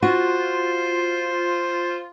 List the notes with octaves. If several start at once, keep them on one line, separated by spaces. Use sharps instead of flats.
F4 F#4 C5